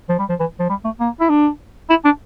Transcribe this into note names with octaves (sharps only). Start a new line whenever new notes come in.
F3
G3
F3
E3
F3
G3
A3
A#3
E4
D4
E4
D4